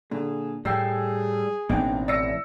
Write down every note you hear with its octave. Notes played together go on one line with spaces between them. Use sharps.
A#2 D3 G#4
A2 G3 G#4 G5 E6 C7
A1 B2 A#3 C4 D4 D#4 G5
E4 D5 E6 A#6 C#7